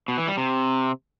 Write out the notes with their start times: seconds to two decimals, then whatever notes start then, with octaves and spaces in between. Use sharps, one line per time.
0.08 B2
0.18 E3
0.28 G3
0.37 C3